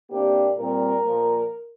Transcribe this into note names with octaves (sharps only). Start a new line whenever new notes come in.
C3 A#3 D4 G4
A#2 G3 C4 A#4
A#2 F3 A#3